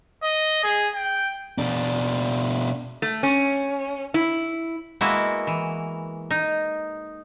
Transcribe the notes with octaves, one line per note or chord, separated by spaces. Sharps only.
D#5
G#4
G5
B2 D4
A3
C#4
E4
G#3 A#3 B3 E4 F#4
E3
D#4